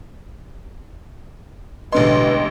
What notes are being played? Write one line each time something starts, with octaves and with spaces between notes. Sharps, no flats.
A1 B2 D3 G#3 B3 B4 D#5 C6